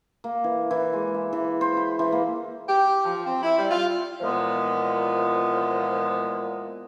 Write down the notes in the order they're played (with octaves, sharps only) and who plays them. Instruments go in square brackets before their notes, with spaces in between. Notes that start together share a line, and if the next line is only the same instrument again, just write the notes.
[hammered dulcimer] A#3
E3
E3
G#3
E5
E3
C5
B5
E3
A#3
[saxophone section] G4
F3
C4
E4
G3
F4
[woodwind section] A#2 E3 F3 G#3 B3